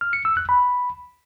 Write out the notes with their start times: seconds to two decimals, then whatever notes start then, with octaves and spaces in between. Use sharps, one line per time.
0.01 F6
0.13 C#7
0.25 E6
0.37 F#6
0.49 B5